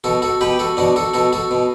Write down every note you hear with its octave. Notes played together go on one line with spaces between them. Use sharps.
B2 F#4 A4
F#4 A4
B2 G4 B4
F#4 A4
B2 D4 F#4
F#4 A4
B2 F#4 A4
F#4 A4
B2